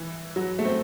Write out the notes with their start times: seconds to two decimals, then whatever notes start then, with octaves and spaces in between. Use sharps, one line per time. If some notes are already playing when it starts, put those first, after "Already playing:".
Already playing: E3
0.36 F#3
0.59 A3
0.65 C4